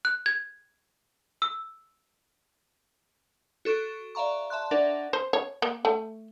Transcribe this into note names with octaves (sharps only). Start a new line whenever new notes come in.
F#6
G#6
E6
F#4 A4 C#6 F#6 D7
D5 E5 F5 A#5 C#6
E5 A5 C6 F#6
D4 A#4 D5 E5 F#5
C5
C#5
A#3
A3